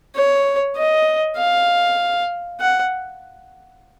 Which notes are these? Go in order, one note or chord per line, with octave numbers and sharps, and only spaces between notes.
C#5
D#5
F5
F#5